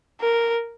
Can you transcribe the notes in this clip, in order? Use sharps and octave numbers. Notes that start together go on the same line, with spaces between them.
A#4